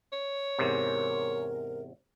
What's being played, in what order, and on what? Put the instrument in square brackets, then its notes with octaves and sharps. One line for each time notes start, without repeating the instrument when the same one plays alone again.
[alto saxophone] C#5
[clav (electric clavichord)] E2 G#2 C3 [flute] A#4